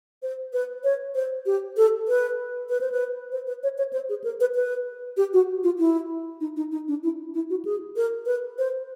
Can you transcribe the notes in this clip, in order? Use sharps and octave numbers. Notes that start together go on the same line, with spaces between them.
C5
B4
C#5
C5
G4
A4
B4
B4
C5
B4
C5
B4
C#5
C#5
C5
G#4
A#4
B4
B4
G4
F#4
F4
E4
D#4
D#4
D#4
D4
E4
E4
F#4
G#4
A#4
B4
C5